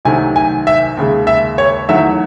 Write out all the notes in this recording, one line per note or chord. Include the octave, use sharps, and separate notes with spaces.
C2 C3 D#3 F#3 A3 G#5
G#5
E5
D#2 C#3 G#3
E5
C#5
E2 D#3 F#3 A3 E5